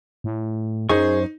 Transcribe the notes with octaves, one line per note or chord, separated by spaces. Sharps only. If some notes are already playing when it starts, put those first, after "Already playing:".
A2
F#2 D#4 G#4 C5 C#6